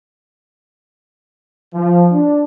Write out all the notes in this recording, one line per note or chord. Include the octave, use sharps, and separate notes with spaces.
F3
D4